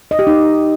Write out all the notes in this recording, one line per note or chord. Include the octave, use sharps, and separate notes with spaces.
D#5
G4
D#4